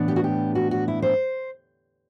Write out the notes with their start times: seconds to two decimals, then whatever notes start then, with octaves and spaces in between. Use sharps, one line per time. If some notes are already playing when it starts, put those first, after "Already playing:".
Already playing: A2 E3 B3 D4
0.08 G4
0.16 F#4
0.24 G4
0.55 F#4
0.71 F#4
0.88 E4
1.02 C5